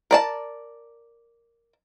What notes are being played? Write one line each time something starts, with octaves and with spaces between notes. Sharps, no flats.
A#4 D5 A5